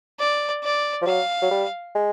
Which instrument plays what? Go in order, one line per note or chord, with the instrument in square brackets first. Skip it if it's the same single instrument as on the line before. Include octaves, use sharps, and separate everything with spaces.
[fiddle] D5
D5
[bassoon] F3
[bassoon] F#3 [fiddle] F5
[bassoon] F#3
G3
G#3